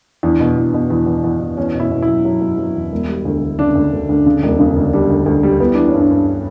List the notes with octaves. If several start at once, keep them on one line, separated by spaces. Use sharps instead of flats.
E2 D4
B2
E2
B2
E2
E2
E2
E2
E2 C#4
B2
E4
B2
E4
F#3
F#3
F#3
F#3
E2
E1
G3
D2
D2
C#3 D4
D2
D2
D2
C#3
E1
C#3
D2
G3 D4
D2
D2
G3
B3 E4
E3 D4
C#4
G2
D4
G2